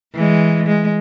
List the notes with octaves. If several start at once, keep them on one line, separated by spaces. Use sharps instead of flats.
E3 G#3
G#3